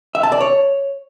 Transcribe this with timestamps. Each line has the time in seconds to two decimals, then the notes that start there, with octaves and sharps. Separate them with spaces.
0.15 E5
0.23 A5
0.32 D5
0.40 C#5